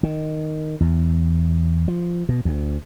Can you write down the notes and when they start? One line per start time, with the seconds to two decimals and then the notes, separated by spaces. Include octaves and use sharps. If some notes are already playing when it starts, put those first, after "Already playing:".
0.03 D#3
0.81 E2
1.88 F3
2.29 B2
2.45 D2